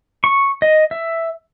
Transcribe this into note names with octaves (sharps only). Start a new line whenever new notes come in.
C#6
D#5
E5